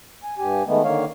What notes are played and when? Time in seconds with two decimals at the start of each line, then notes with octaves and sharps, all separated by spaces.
0.23 G#5
0.38 G2 G4 G#5
0.67 D#3 G#3 A3 B3
0.84 D3 D#3 A#3 C#5 F5